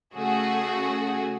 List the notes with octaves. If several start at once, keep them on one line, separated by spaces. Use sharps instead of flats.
C#3 A3 F#4 G#4